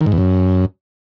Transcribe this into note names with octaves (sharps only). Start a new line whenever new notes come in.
D#3
G#2
E2
F#2